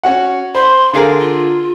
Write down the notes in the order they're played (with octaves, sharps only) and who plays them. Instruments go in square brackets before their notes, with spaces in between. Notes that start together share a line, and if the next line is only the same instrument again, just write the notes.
[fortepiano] C#4 F#4 F#5
[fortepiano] C5 B5 [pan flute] C6
[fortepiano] D3 G#4 A#4 [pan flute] F5
[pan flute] F4